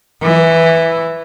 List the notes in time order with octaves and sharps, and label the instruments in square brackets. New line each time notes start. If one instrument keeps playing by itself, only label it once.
[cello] E3